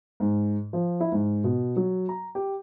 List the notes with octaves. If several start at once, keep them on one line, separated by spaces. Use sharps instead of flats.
G#2
F3
E4
G#2
B2
F#3
A#5
G4